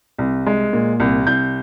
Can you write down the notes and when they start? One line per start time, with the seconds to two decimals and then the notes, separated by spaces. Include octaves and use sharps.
0.18 C2
0.46 G#3
0.73 A#2
1.00 C2
1.27 C2 G6